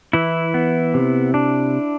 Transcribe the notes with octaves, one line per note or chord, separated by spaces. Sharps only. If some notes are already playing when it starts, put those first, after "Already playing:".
E3 E4
B3
C3
D4